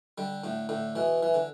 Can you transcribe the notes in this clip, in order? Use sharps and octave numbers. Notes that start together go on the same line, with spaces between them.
D3 G3
A2 D3
A2 D3
B2 E3
E3
D3